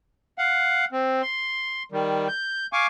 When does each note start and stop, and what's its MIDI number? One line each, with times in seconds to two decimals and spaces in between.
0.38 0.85 77
0.38 0.85 78
0.92 1.22 60
1.22 1.83 84
1.92 2.28 51
1.92 2.28 55
2.28 2.67 91
2.73 2.87 77
2.73 2.87 80
2.73 2.87 85
2.73 2.87 86